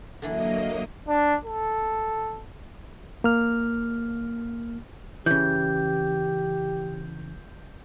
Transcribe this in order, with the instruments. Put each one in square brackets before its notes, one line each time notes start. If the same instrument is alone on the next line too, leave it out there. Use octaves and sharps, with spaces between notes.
[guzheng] D3 E3 E4 [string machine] F#3 A#3 D#5
[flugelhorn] D4
A4
[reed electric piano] A#3 F6
[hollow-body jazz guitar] C#3 E3 [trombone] G4 [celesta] G6